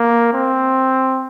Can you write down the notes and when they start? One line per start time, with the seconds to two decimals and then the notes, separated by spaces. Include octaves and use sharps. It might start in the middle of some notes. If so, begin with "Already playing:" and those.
Already playing: A#3
0.33 C4